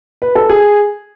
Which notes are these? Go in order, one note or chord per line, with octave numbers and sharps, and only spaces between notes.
B4
A4
G#4